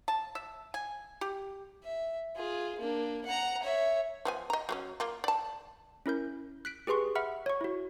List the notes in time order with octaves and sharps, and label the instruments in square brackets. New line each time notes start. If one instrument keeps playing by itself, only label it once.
[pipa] A5
E5
G#5
G4
[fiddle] E5
F4 G#4
A#3 D4
F#5 A#5
C#5 E5
[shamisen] F3 B3 G#5
D#5 A#5
F#3 A#3 C#4
A#3 F4
D5 A5
[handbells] C#4 E4 A#4 G6
F#6 B6 D7
G4 G#4 B4 C6 C#6
E5 F#5 B5 F6
C#5 C#6
E4 F#4